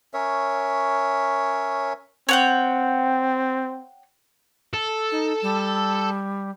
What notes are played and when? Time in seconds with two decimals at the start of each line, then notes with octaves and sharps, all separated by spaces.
0.14 C#4 A#4 C#5 E5
2.29 C4 C#5 F#5 G5
4.74 A4
5.12 D#4
5.42 G3